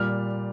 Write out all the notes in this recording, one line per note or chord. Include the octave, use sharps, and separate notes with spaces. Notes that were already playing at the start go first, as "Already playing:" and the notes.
Already playing: A#2 G3 F6